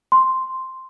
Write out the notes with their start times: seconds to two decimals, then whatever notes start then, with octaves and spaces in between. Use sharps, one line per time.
0.12 C6